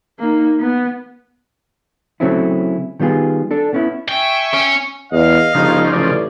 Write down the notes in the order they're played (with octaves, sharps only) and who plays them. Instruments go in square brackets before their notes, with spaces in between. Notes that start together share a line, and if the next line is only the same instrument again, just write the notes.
[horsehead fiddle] A#3 D#4
B3
[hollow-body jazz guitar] C#3 F#3 A3 C4 C#4 E4
D#3 G3 B3 F4 G#4
D4 A4
B3 C#4 E4
[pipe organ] E5 G#5 C#6 [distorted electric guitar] G5
[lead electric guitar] C#4
[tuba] E2 [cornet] D#5 [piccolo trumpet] F5
[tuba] G1 [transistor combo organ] C#3 F3 [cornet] D#4
[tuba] A1 [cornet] D5